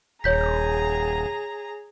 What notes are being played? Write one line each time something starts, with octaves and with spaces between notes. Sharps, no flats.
D#1 G#4 C#5 A#5 G6 B6